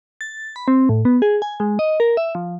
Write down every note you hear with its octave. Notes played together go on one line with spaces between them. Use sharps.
A6
B5
C4
A2
B3
G#4
G#5
G#3
D#5
A#4
E5
F3